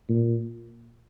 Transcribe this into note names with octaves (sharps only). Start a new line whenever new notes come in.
A#2